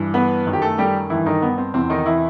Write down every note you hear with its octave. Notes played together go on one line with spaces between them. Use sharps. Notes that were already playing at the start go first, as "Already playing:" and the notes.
Already playing: G2 E3
B3 B4
F#2 D#3
G4
A3 A4
G3 G4
G2 D#3 E3 E4
D#3 D#4
B3
C4
E2 C3 E3 C4
D#3 D#4
E3 E4